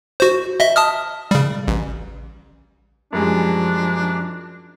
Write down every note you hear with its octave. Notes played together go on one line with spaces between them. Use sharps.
F#4 C5
D#5 E5
A5 D#6 F6
C#3 G3
A1
F#2 F3 G3 G#3 D4